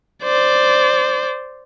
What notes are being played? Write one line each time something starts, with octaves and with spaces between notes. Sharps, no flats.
C5 D5